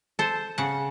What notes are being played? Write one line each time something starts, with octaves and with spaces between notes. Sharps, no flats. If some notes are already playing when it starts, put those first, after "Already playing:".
A4 C5
C#3 F#5